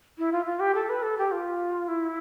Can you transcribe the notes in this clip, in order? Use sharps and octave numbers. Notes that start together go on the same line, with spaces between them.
E4
F4
F4
G4
A4
B4
A4
G4
F4
E4